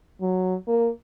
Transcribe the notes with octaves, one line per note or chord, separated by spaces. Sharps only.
F#3
A#3